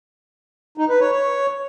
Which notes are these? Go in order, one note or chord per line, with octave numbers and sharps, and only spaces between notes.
D#4
B4
C#5
C#5